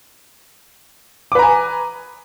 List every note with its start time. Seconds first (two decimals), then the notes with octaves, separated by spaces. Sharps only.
1.32 D6
1.35 B4
1.39 A#5
1.42 G#5